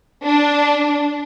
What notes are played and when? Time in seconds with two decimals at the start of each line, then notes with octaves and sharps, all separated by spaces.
0.24 D4